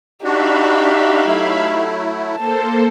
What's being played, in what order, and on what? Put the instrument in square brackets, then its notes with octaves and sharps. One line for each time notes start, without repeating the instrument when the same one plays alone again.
[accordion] D4 F#4 [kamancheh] D#4 G4 [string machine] E5 F5 B5
[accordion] F#3 A3 E4
[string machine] A#3 A4 C5 [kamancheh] A5